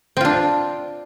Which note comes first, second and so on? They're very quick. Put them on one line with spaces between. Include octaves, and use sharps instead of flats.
C4 F4 D4